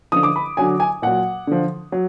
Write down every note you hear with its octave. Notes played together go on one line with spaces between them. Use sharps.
D3 F3 D#6
D6
B5
D3 F#3 G#5
G#5
A#2 F#3 F#5
D3 F3
F#3